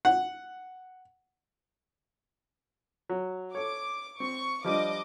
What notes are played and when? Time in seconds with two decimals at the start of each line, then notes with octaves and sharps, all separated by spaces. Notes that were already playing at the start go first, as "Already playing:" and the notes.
0.05 F#5
3.09 F#3
3.55 A4 C#5 D6
4.20 C4 C#6
4.64 F3 G3 D4 D#5 D6